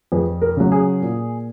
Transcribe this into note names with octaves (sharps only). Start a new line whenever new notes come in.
F2 G#4 B4
A#4
C#3 F#3
G#4
A#2